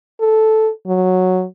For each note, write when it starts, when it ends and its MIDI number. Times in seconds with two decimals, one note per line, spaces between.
0.21 0.70 69
0.87 1.45 54